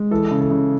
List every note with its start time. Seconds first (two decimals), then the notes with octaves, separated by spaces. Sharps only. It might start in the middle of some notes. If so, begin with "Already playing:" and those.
Already playing: G#3
0.11 E3 A4
0.31 C#3
0.41 A4
0.51 C#3